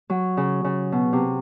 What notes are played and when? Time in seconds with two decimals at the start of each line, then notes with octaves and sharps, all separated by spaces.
0.10 F#3
0.37 C#3
0.64 C#3
0.92 B2
1.13 C3